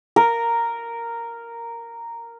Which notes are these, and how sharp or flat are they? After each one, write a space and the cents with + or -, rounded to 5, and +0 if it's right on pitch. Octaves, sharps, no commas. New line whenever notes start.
A#4 -5